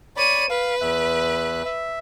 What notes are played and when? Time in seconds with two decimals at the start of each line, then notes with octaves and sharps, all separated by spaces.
0.17 C#5 D5 B5 D#7
0.50 B4 F5
0.81 E2 E5 F#6
1.65 E5